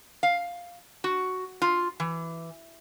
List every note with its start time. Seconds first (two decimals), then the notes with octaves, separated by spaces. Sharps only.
0.23 F5
1.04 F#4
1.62 F4
2.00 E3